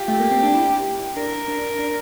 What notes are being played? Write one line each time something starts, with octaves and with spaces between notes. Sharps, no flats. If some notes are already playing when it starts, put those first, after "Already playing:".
Already playing: F4 G4
A3
A#3
C4
D4
E4
D4 A#4
D4
D4